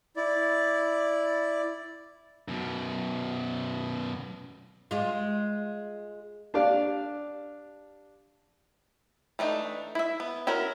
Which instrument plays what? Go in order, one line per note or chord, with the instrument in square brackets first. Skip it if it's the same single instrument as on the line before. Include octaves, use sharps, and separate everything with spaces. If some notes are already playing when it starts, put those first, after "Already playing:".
[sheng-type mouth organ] E4 D5
[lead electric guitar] F#2 B2
[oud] G#3 F4
[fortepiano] D4 G4 D5 F5
[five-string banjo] E3 A3 D4 D#4
E4 E5
B3
C#4 E4 F#4 A#4 B5